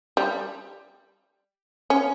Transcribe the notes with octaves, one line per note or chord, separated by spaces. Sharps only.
G3
C#4